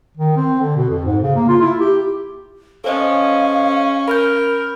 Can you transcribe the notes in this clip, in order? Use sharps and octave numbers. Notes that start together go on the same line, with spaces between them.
D#3
C4
D3
B2
F2
G#2
C#3
A#3
F4
E4
G4
C#4 A4 C5 D#5 F5
A#4 B5 F6 G6